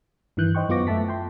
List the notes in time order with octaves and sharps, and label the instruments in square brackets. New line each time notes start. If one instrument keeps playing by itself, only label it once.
[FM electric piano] G2 D#3 E3 F#6 G6
C5 D#5 G5 C#6
F#2 B3 F4 C#6 D6 A#6
F#2 A3 E5 A5 B6
G5 C6